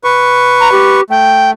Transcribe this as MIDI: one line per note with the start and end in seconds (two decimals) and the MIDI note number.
0.04 1.01 71
0.04 1.01 85
0.60 0.71 82
0.72 1.03 67
1.10 1.53 57
1.10 1.50 79